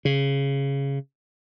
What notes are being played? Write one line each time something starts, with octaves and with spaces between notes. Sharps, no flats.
C#3